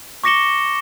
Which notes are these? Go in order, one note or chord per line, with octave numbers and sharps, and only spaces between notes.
C#6 D6 A#6 C#7 E7 G7